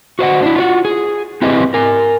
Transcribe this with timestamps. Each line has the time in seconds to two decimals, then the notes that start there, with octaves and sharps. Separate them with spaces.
0.19 F#4 C5 D#5 F#5
0.43 D4 E4
0.56 F4 F#4 C#5 F#5
0.85 G#4
1.42 C4 E4 G4 G#4 B4 D#5
1.74 A#4 G#5